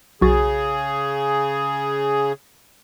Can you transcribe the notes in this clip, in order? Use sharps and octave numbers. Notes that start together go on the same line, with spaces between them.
B1 C#3 F#4 G#4 A6